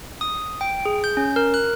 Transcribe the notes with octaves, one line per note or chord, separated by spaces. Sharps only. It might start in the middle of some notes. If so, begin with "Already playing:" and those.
D#6
G5
G#4
G6
C#4
A#4
F#6